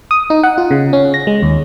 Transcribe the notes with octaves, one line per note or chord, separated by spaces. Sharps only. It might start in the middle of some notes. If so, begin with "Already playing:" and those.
D#6
D#4
F#5
F4
C#3
C#4
A#6
G#3
D#2